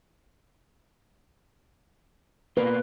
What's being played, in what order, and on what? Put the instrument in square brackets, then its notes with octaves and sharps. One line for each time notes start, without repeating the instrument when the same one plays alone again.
[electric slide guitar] B2 A#3 F4 [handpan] B4